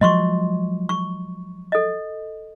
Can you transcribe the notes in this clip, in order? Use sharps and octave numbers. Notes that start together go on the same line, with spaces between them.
F3 F#3 G#3 D#5 C6 C#6
C#6
A4 D#5